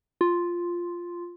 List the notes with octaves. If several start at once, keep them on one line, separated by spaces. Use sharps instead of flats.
F4